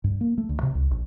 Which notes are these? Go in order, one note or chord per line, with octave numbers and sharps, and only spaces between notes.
G2
A#3
A3
D2
C3
C#2
A#1